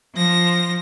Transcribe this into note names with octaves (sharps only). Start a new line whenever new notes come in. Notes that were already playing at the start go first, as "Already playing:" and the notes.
F3 A#6